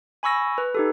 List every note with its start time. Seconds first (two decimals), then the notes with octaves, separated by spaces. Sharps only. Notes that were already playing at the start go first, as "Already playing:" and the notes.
0.23 G#5 B5 C#6 E6 A#6
0.58 B4
0.75 D#4 G4 A4